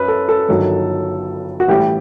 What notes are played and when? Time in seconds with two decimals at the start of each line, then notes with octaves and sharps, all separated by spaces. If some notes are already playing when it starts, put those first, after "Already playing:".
Already playing: F#2 B4
0.08 A4
0.29 A4
0.48 G1 G2 D#3 F#3
1.60 F#4
1.68 A1 A2 G3 G4